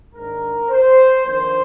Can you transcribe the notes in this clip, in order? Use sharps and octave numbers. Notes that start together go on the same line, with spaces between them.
G#2 D#3 A#3 D4 A#4
C5
F2 D#3 A#3 D4 C5